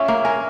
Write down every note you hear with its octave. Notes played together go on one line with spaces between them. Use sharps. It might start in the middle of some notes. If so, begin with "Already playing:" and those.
Already playing: C#4 F4 E5
A#3
A#4 G#5